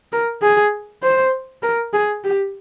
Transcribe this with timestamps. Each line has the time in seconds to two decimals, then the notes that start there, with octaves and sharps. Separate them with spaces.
0.13 A#4
0.42 G#4
1.03 C5
1.63 A#4
1.93 G#4
2.24 G4